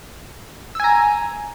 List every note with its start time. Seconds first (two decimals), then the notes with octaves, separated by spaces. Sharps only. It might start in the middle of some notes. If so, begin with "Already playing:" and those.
0.75 E6
0.80 G#5
0.84 A#5